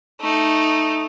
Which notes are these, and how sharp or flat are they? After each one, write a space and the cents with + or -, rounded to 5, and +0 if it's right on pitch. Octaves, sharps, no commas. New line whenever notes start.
A3 +0 D#4 +0